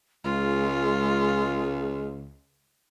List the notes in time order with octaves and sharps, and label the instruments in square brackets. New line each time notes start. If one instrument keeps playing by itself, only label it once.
[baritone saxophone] C#2 [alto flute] G#3 [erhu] F4